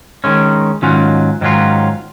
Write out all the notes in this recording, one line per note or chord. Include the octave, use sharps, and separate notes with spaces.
D#3 G#3 C#4
G#2 D#3 F#3 C#4 F4
G#2 D#3 F#3 C#4 F4